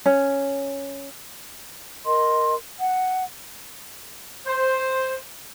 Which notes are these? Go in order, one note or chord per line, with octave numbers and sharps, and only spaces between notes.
C#4
A#4 D#5 C6
F#5
C5